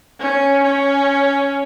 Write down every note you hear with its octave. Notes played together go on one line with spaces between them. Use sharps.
C#4
C#4